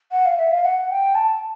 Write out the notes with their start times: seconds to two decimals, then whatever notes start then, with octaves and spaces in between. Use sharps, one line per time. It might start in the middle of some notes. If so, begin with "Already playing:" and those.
0.12 F#5
0.25 F5
0.37 E5
0.51 F5
0.63 F#5
0.90 G5
1.15 A5